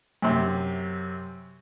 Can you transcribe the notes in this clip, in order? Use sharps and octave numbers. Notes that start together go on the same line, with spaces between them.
F#2 C3